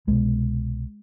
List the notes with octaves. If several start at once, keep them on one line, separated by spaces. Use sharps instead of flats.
C2 B2 G#3